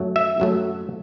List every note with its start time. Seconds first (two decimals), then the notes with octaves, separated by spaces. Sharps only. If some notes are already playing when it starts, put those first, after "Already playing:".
Already playing: F#2 F#3 A3
0.16 E5
0.40 F#2 F#3 A3